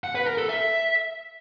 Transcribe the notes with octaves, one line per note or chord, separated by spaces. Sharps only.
F#5
B4
A#4
A4
E5